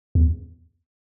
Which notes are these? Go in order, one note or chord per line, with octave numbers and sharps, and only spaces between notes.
E2